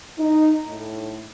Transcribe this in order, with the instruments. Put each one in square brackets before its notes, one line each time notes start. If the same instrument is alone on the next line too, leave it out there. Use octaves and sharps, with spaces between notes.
[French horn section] D#4
A2